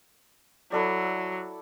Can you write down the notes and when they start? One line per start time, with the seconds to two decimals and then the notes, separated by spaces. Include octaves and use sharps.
0.72 F#3 E4 A4 D5